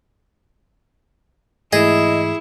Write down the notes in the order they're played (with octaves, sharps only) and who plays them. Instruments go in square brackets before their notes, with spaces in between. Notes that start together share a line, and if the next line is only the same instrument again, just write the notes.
[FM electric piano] G#2 E3 A3 [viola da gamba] E4 [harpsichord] G#4 [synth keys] D#5